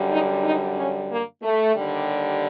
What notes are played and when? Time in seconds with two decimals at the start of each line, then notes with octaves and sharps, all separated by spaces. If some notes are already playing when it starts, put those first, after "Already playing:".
Already playing: F#2 D3 G3
0.10 D#4
0.43 D#4
0.76 C#4
1.10 A#3
1.43 A3
1.75 D#2 D3 G3